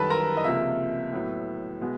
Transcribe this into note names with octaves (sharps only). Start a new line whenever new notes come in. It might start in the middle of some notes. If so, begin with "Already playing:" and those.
Already playing: F#2 D#3 G3 A4 B4 A5 B5
A#4 A#5
D#5
C#2 C3 F3 A#3 E5
A2 F#3 B3
B2 G#3 B3